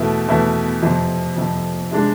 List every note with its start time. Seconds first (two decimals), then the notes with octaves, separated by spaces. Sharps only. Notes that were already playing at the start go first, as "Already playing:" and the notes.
Already playing: E2 B2 A3 E4
0.28 E2 B2 A3 E4
0.82 F2 C3 F3
1.37 F2 C3 F3
1.91 C3 G#3 D4